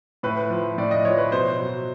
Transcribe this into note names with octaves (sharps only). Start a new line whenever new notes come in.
A2 B4
F3
A2 D5
D#5
F3 C#5
B4
B2 C5
F#3